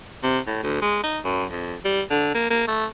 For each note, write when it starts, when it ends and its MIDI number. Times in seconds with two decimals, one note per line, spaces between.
0.23 0.39 48
0.47 0.60 45
0.63 0.79 38
0.82 1.00 56
1.04 1.19 63
1.24 1.45 42
1.50 1.76 41
1.85 2.01 55
2.10 2.34 50
2.35 2.50 58
2.50 2.65 58
2.67 2.85 57